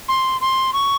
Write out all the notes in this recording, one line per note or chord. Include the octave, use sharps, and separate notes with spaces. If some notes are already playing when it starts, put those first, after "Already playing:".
C6
C6
C#6